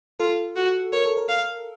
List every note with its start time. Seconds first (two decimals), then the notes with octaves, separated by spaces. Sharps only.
0.20 F4 A4
0.56 F#4
0.93 A#4 C#5
1.06 A4
1.17 A#4
1.29 F5